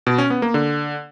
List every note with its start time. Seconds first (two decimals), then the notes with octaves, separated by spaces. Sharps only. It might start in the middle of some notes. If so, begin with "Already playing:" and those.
0.07 B2
0.18 C#4
0.30 B3
0.42 A#3
0.54 D3